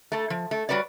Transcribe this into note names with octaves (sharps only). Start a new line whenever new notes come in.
A3 A4
F3
A3
G3 F#4 B4 C#5 D5